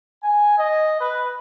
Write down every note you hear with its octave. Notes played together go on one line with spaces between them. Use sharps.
G#5
D#5
B4